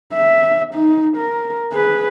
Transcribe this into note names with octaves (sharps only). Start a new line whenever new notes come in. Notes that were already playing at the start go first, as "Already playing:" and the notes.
E5
D#4
A#4
G#4 B4